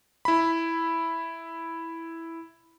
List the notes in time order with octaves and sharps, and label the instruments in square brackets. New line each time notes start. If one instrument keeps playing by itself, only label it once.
[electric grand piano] E4 B5